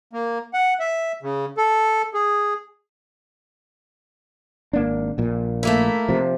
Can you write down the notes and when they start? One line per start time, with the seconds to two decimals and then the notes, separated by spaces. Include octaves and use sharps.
0.13 A#3
0.54 F#5
0.80 E5
1.23 C#3
1.57 A4
2.14 G#4
4.73 G#1 A#3 D4
5.18 A#1 A#2
5.63 A3 A#3 E4
6.08 C3 F3